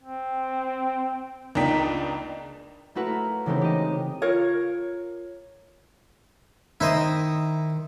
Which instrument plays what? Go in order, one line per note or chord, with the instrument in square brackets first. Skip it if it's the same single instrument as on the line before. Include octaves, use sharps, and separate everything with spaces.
[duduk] C4
[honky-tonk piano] C#2 A#3 D4 D#4 G5 B6
[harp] A3 A#3 E4 F#4 A#4 B4
C#3 E3 G#3 A3 C4 D#4
G4 D#5
[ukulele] F4 A#4 C#5
[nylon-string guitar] D#3 D#4 [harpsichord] E4 C5 D#5